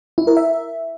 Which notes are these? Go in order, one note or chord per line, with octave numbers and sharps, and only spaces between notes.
E4
A#4
E5